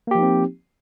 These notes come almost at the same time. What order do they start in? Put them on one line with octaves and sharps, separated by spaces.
A#3 G4 F3 D#4 C4